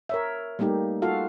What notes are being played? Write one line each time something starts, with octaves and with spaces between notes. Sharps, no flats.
A#4 C#5 E5
G3 A3 A#3 D#4 G4
F4 F#4 A4 F5